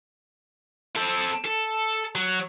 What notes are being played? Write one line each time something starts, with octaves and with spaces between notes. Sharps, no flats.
C4 A4
A4
F#3